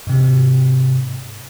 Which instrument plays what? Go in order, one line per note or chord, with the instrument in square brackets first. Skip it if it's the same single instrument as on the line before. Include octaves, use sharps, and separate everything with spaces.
[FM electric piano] G#2 C3